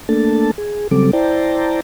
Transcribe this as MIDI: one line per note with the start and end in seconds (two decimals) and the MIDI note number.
0.09 0.51 57
0.09 0.51 58
0.09 0.51 62
0.09 0.51 69
0.09 0.51 81
0.58 0.88 68
0.91 1.11 49
0.91 1.11 54
0.91 1.11 55
0.91 1.11 60
0.91 1.11 69
0.91 1.11 86
1.13 1.80 64
1.13 1.80 72
1.13 1.80 74
1.13 1.80 79
1.13 1.80 81
1.13 1.80 82